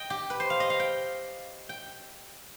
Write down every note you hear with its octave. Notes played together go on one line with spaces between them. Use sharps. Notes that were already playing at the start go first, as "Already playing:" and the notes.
Already playing: D#5 G5
G4
B4
C5
F5
D#5
F5
G5
G5